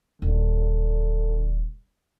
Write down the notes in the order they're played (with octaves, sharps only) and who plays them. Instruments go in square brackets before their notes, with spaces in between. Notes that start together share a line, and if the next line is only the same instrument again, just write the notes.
[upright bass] D#1 [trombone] D3